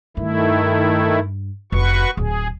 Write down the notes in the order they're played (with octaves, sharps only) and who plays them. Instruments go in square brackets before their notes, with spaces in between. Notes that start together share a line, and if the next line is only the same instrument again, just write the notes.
[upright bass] G2 [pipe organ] D#3 A3 E4
[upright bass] F1 [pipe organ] F#4 B4 C#6
[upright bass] D1 [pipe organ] G#4